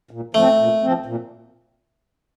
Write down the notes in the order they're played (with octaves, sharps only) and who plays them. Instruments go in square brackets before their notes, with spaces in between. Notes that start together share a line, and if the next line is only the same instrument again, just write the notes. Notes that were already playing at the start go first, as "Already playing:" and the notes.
[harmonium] A#2
[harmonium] F3 C4 [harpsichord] A3
[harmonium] A#2
F3 C4
A#2